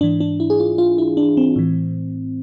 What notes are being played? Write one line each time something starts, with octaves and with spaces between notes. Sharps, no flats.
G#2 E3 D4
D4
E4
G#4
F4
F4
E4
D4
C4
A2 E3